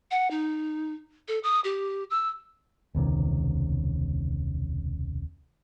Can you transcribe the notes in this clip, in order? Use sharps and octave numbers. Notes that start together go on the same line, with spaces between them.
F#5
D#4
A4
D#6
G4
E6
E1 C#2 C3 D#3